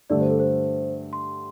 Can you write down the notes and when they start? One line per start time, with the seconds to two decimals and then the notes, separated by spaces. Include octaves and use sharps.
0.10 G2 D3 A3 D5
0.20 C5
0.30 A4
0.40 C5
1.13 C6